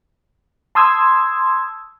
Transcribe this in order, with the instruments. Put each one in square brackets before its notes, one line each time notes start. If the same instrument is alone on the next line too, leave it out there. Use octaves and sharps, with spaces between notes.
[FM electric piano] A5 C6 D#6 E6 G#6